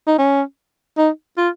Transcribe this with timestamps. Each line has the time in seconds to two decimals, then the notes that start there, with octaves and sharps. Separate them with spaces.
0.07 D#4
0.19 C#4
0.98 D#4
1.38 F4